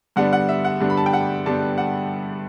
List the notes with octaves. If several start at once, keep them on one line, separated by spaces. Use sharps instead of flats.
G2 D3 G3 B3 D4 F#5
F#5
E5
F#5
G2 D3 G3 B3 D4
B5
A5
G5
F#5
G2 D3 G3 B3 D4 A5
F#5